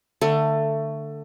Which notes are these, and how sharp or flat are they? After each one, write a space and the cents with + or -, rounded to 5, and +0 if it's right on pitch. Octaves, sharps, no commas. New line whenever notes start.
D3 +10 A3 +20